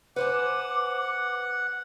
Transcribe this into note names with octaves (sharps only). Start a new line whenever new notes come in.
B4 C5 F#5 G#5 D6